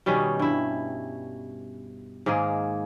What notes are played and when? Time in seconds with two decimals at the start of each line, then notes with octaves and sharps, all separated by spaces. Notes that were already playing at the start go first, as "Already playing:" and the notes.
0.06 B2 D#3 G3 C#4
0.39 G2 E4
2.26 G#2 D#3 A#3 G#4